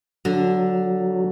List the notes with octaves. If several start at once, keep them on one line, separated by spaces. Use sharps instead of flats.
D3 F#3